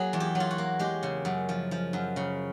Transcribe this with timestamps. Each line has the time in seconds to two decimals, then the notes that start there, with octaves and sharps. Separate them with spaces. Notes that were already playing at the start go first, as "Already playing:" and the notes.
Already playing: F#3 A#3 G#4
0.13 E2
0.20 G4
0.35 F#3
0.40 F4
0.51 F#4
0.58 A#3
0.79 G#3 G4
1.03 C#3
1.25 F#2
1.49 F3
1.71 F3
1.93 F#2
2.16 C#3